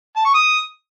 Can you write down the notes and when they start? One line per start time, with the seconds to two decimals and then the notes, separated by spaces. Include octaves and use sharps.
0.16 A5
0.25 C#6
0.34 D#6